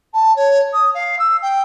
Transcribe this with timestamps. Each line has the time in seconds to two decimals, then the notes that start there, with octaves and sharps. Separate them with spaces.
0.13 A5
0.36 C#5
0.73 D#6
0.94 F5
1.19 E6
1.42 G5